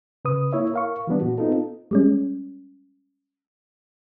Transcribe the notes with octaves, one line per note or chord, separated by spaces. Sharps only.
C#3 B4 D#6
A#3 E4 C#5 E5
A#4 F5 C#6
E3 G3 B3 D4
A#2 F#4
B3 C4 D#4 F4 A4
G3 G#3 C#4